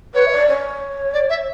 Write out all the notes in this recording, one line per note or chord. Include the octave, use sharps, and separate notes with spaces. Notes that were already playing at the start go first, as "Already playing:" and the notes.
B4 C#5
E5
D5
C#5
D5
E5